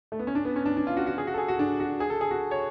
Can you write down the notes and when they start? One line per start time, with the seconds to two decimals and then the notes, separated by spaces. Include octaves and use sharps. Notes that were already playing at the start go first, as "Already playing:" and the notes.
0.12 A3
0.19 B3
0.27 C#4
0.35 D4
0.45 B3
0.56 C#4
0.66 D4
0.77 D4
0.87 F4
0.97 F#4
1.07 F#4
1.18 G#4
1.27 F#4
1.34 A4
1.38 G#4
1.48 F#4
1.59 D4
1.80 F#4
2.00 G#4
2.10 A4
2.21 G#4
2.31 F#4
2.51 C#5